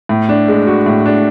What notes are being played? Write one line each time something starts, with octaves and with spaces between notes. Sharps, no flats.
A2
D4
G#3
F#4
A2
D4